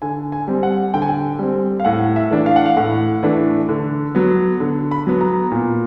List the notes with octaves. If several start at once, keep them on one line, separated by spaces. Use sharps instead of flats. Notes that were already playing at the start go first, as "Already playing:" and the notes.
D3 G#5
G#5
G3 C4
F#5
D3 G5
G#5
G5
G3 C4
F5
A2 F#5
E5
E3 A3 D4
F5
F#5
F5
A2 F#5
E3 A3 D4
D3
F#3 B3
D3
B5
F#3 B3
A#5
A#2